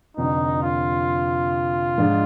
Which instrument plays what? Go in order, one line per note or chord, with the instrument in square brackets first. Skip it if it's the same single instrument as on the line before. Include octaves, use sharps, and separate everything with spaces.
[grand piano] F1 F2 D3 [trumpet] D#4
[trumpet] F4
[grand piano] G#2 F3 G#3 D4